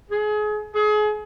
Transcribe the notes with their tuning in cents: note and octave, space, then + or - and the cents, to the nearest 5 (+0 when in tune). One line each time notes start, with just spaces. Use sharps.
G#4 +30
G#4 +30